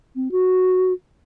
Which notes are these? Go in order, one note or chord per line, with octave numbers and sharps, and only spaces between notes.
C4
F#4